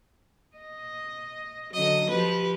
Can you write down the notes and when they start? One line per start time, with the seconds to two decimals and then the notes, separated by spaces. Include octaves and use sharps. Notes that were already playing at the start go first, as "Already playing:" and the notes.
0.57 D#5
1.74 D3 F#3 D#5
2.10 F3 G4 B4